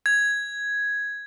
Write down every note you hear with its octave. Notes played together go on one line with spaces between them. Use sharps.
G#6